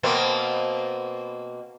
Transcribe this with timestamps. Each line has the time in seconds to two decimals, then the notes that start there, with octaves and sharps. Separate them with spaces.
0.03 B2 A#3 C4